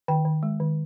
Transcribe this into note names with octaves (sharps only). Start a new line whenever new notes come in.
D#3 G5
D#3
G#3
D#3